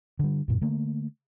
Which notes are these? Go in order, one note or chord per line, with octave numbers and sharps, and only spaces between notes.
D3 G3
F#2 A#2
D3 A3 A#3